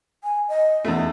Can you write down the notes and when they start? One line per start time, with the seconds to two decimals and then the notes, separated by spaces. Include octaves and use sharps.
0.24 G#5
0.49 D#5
0.85 E2 A3 D#4